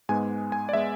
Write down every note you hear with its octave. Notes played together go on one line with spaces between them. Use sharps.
G#2 G#3 B3 G#5
G#5
D5
G#3 B3 E5